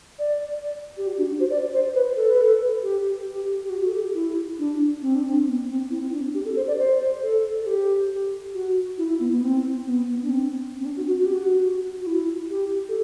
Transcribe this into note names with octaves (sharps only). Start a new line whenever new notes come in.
D5
G4
F#4
D4
F#4
C5
D5
C5
B4
A4
B4
A4
G4
G4
G4
F#4
A4
G4
E4
D4
C4
D4
C4
B3
C4
E4
C4
D4
G4
A4
C5
D5
C5
A4
A4
G4
F#4
E4
E4
B3
B3
C4
B3
B3
D4
C4
C4
D4
F#4
F#4
F#4
G4
F#4
F#4
E4
G4
A4